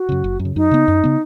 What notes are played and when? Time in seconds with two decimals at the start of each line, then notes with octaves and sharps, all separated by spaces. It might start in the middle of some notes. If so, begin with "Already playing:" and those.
Already playing: F#4
0.09 F#2 C#3
0.24 F#1
0.39 F#2
0.45 C#3
0.56 F#2 D#4
0.71 C#3 B3
0.88 F#2
1.04 C#3 B3